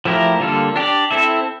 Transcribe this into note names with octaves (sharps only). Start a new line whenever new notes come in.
F3 A3 E4 G4 A#4
D3 G3 A#3 F4 A4
D4 G4 D5
C4 E4 A4 E5